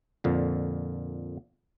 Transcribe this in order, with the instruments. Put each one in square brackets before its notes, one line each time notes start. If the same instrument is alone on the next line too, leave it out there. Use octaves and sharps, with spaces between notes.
[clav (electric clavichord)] F2 A#2 D3